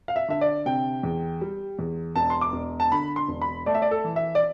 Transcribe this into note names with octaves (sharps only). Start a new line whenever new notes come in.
F5
E5
D3 E5
D5
C3 G5
E2
G3
E2
E1 A5
C6
D6
E1
A5
D3 B5
C6
E1
B5
A3 D5
E5
D5
A4
E3
E5
D5